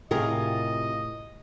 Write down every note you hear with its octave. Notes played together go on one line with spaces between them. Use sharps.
A2 C3 F4 G4 G#4 A#4 D#5